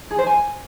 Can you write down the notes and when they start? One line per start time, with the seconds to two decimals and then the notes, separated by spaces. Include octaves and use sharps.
0.11 G#4
0.18 C5
0.26 G#5